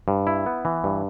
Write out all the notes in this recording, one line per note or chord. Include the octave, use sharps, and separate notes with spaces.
G2
E4
B3
E3
G2